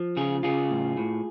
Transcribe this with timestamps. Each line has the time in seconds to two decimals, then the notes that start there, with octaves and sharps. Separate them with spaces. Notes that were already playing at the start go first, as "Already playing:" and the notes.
Already playing: F3
0.17 C#3 F4 G#4
0.43 C#3 F4 G#4
0.71 A2
0.97 A2